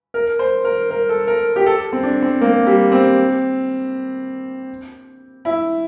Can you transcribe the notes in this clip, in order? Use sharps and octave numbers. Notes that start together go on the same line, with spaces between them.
A#4
C5
A#4
A#4
A4
A#4
G4
A4
C4
D4
C4
A#3
G3
C4
E4